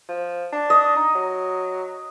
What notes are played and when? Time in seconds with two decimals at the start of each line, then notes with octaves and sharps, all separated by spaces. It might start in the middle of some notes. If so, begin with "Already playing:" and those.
0.09 F3
0.53 D4
0.70 D#5
0.96 D#4
1.15 F#3